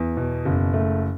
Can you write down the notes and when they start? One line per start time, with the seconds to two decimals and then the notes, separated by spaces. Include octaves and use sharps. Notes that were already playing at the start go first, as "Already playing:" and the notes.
Already playing: E2
0.17 B2
0.45 F#1
0.74 A3